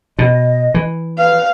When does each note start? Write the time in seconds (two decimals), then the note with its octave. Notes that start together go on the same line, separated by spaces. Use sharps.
0.19 B2 D#5
0.74 E3
1.18 B4 F5